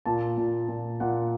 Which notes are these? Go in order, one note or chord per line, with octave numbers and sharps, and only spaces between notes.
A#2 A5
A#2
A#2
A#2 F#5